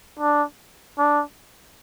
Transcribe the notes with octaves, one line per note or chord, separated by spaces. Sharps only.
D4
D4